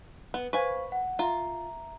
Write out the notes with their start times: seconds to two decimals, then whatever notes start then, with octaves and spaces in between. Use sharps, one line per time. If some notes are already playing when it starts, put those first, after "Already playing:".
0.34 B3
0.53 B4 C5 F5 G#5 C#6
0.92 F#5
1.19 F4 E5 A#5